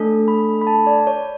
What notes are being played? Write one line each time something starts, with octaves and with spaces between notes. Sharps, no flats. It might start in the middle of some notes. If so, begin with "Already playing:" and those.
Already playing: A3 D4 A4
B5
B5
A5
D5
C#5